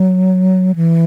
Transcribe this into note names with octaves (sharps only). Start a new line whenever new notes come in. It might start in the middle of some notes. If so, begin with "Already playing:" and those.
Already playing: F#3
E3